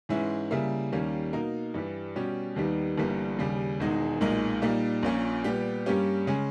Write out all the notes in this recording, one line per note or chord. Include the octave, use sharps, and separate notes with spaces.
G#2 E3 G#3 C#4 E4
C#3 G3 A#3 E4
D#2 D#3 G3 A#3 C#4
B2 A#3 D#4 A#4
G2 E3 G3
B2 G3 C#4 G4
D#2 D#3 G3 B3 D#4
G1 G2 E3 G3 A#3
D#2 C#3 G3
E1 E2 D#3 G#3 D#4
B1 A#2 G#3 D#4 A#4
A#2 G3 A#3 D#4
A#1 A#2 A#3 C#4
A#2 G3 B3 G4
G2 G3 A#3 C#4 G4
C#3 G#3 C#4